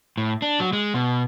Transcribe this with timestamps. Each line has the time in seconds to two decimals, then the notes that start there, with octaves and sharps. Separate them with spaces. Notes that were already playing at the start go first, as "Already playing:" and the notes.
0.17 A2
0.42 D4
0.60 F#3
0.73 G#3
0.94 B2